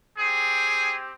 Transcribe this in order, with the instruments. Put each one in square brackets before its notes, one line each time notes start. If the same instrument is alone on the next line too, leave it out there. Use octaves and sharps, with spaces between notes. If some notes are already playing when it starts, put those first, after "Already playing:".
[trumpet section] C4 G4 G#4